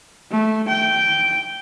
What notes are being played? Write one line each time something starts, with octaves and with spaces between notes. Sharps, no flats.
A3
G5